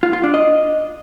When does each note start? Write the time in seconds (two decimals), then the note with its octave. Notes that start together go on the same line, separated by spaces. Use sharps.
0.03 F4
0.13 F4
0.23 D4
0.34 D#5